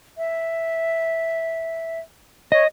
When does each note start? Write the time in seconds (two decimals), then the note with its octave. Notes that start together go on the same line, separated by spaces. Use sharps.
0.18 E5
2.52 C#5 D#5